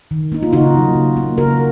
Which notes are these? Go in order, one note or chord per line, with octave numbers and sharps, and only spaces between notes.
D#3
A#3 D#4
F4
C#3 D#4 F#4
F#3 A#3
C#3
F#3 A#3
C#3 F#4 A#4